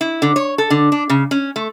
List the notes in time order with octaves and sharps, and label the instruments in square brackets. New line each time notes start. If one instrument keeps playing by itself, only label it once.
[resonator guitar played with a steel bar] E4
D3
C#5
A4
D3
D4
C#3
C#4
A3